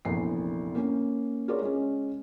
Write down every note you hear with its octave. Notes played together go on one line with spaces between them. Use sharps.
F1 A#1 E2 C7
A#3 C#4
F4 G#4 A#4 C#5 D5
G#3 C#4